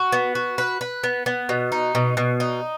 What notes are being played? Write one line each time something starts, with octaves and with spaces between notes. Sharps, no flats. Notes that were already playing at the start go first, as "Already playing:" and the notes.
Already playing: F#4
B3
F#4
B4
B4
B3
B3
B2
D#4
B2
B2
D#4